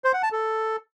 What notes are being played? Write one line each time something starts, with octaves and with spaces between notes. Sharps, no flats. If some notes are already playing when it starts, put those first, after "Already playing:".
C5
F#5
A5
A4